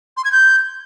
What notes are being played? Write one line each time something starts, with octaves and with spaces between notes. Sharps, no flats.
C6
G#6
G6